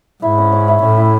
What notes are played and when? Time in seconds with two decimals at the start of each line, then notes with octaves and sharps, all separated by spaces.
0.22 G#2 E4
0.38 C#4
0.52 C#4
0.68 E4
0.82 A2 C#4
0.97 E4